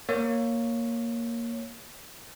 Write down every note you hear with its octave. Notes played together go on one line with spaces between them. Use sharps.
A#3 C#5